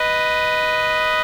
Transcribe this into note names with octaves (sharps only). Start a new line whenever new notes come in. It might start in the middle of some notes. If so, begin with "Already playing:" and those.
Already playing: B4 D#5